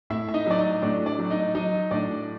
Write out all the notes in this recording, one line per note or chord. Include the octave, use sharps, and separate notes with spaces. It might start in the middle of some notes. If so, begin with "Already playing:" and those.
A2 E4 E5
E5
D#4 D#5
F#3 D5
D#4 D#5
A2 D4 D5
D4 D5
F#3
D#4 D#5
F#3 D#4 D#5
A2 D4 D5